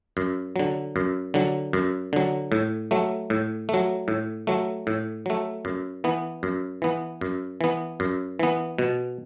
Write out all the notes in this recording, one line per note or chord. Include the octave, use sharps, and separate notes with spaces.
F#2
D3 F#3
F#2
D3 F#3
F#2
D3 F#3
A2
F#3 A3
A2
F#3 A3
A2
F#3 A3
A2
F#3 A3
F#2
E3 B3
F#2
E3 B3
F#2
E3 B3
F#2
E3 B3
B2